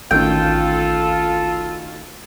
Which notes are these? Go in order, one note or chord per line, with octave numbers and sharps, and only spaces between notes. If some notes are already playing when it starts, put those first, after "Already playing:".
A1 D2 D#3 C#4 F4 A4 G5